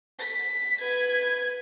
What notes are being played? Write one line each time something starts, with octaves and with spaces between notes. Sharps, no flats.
B6
B4 G#6